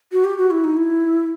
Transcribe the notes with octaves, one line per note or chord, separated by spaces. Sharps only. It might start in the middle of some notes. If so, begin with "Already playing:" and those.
F#4
G4
F#4
E4
D#4
E4